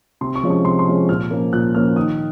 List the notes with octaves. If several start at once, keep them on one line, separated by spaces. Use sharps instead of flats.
C3 C6
C#6
F3 G#3 C#4
C#6
C3 C6
C6
F3 G#3 C#4
A#2 F6
F3 A#3 C#4
A#2 F#6
F3 A#3 C#4 F6
D#3 D#6